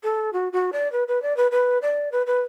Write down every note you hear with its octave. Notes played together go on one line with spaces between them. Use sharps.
A4
F#4
F#4
D5
B4
B4
D5
B4
B4
D5
B4
B4